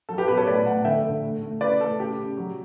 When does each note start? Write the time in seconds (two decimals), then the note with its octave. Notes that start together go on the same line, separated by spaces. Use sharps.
0.09 F#3 A4
0.18 G4 B4
0.28 B2 G4 B4
0.37 A4 C#5
0.47 A2 B4 D5
0.65 A2 F#5 A5
0.84 D3 E5 G5
1.03 D3
1.22 A3
1.42 A3
1.61 C#3 B4 D5
1.80 A3 A4
1.99 C#3 G4
2.18 C#3
2.37 F#3